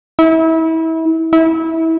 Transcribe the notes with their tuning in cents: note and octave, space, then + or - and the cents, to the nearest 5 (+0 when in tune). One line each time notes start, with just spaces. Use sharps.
E4 -30
E4 -25